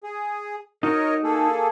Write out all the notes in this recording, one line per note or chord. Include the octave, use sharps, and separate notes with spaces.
G#4
D#4 F#4 A#4 C#5 D#5
A#3 G#4 A4